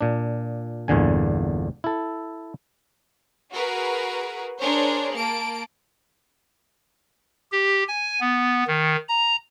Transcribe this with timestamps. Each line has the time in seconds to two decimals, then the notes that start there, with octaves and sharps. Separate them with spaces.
0.01 A#2 D4
0.88 G1 E2 A#2 D3 G#5
1.84 E4 A4
3.52 F#4 G#4 A#4 B4
4.58 D4 G#4 A#4 C5 C#5
5.12 A#3 A5 D7
7.52 G4
7.88 G#5
8.21 B3
8.67 D#3
9.09 A#5